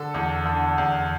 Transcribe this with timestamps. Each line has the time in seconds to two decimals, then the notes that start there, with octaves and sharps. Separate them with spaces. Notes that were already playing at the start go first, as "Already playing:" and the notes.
Already playing: D3 A4
0.14 E2
0.45 D3
0.78 E2